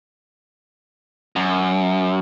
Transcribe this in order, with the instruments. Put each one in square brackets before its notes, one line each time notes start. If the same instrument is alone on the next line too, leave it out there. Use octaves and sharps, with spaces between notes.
[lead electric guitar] F#2